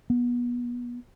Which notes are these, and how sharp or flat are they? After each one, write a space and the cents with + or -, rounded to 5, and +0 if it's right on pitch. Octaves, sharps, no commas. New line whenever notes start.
B3 -25